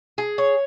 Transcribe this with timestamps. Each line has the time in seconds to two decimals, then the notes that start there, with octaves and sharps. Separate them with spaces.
0.18 G#4
0.38 C#5